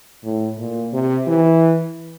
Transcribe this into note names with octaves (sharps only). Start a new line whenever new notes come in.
A2
A#2
C3
E3